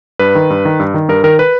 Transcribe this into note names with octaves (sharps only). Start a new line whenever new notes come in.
G2 B4
D#3
G2
D#3
G2
D#3
G2 A#4
D#3 A#4
B4